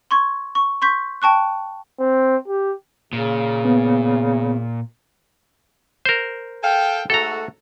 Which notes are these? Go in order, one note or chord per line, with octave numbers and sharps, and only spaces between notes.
C6 C#6 G#6
C#6
C6 C#6 G6 B6
G5 A5 C#6 F#6
C4
G4
A#2 C#3
B3
A#4 C5
A4 F5 G5
G#2 A3 F#4 A4 A#5